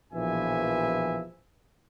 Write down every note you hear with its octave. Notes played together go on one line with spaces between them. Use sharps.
A#1 B2 E3 F3 E5 G#5